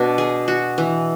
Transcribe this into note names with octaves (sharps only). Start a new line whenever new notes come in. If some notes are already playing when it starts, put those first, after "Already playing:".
Already playing: B2 D4
G#4
F#4
E3